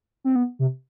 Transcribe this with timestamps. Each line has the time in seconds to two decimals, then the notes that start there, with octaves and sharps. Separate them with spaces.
0.24 C4
0.35 B3
0.59 C3